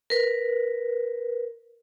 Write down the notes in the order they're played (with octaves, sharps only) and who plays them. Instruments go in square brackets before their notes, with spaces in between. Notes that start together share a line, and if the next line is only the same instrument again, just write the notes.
[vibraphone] A#4 B4